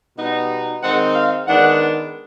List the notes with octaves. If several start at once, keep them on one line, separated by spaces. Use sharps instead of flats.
B2 G3 B3 D#4
D#3 G#3 C4 D#4 F#5
F5
D#3 G#3 B3 D4 F#5